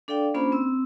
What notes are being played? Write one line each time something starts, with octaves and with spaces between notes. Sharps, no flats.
D4 A4 D5 F5 G5
A#3 C#4 D4 F4 C5 B5
C4 E6